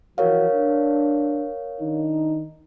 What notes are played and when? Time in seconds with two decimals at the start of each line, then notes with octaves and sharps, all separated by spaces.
0.18 E3 F3 F#4 A#4 C#5 F5
0.54 D4
1.80 D#3 D4 D#4